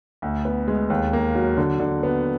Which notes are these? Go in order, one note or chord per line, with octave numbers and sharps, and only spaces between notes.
D2
B3
G#3
D#2
A#3
F#3
D3
D3
B3